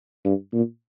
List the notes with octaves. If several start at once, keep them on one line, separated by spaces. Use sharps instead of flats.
G2
A#2